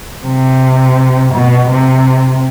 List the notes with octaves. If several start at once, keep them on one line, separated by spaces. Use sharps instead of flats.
C3
B2
C3